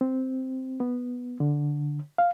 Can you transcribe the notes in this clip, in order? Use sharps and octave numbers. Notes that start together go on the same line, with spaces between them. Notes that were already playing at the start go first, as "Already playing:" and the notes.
C4
B3
D3
F5